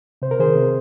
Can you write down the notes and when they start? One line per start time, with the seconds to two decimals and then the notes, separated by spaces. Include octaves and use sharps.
0.22 C3 C5
0.31 A#4
0.39 D#3 G#4 C5
0.55 C3